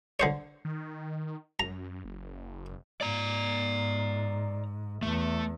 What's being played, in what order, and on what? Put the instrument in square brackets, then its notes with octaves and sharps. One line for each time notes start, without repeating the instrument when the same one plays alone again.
[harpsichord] D3 C5 C#5
[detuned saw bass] D#3
[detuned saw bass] F#2 [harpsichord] A#5
[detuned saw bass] F#1
[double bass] G#2 [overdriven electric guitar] D5 A#5
[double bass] E2 [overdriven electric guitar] A3